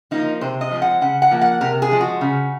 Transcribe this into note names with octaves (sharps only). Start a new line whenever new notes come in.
F3 A#3 D#4
C3 C5
D#5
F3 G#3 C4
F#5
C#3 F#5
F#5
F3 A#3
F#5
C3 A#4
G#4
F3 G#3
F#4
C#3